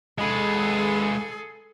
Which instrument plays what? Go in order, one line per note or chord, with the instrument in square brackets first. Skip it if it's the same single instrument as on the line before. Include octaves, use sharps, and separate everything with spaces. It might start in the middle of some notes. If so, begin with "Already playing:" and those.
[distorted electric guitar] G#3 B4 [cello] G#4 A4